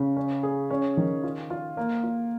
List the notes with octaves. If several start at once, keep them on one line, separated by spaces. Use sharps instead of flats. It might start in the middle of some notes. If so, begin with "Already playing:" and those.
Already playing: C#3
C#4
G#4
C#4
D#3
F4
F4
A#3
F4